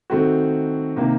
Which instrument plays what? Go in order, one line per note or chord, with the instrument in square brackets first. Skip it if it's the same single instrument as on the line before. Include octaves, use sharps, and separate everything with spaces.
[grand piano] D#3 A3 C4 F#4
C3 D#3 A#3